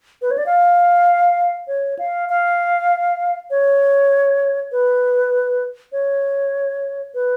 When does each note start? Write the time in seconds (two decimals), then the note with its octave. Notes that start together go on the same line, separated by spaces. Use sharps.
0.22 B4
0.31 C#5
0.38 D5
0.46 F5
1.68 C#5
1.99 F5
2.29 F5
3.51 C#5
4.72 B4
5.92 C#5
7.15 B4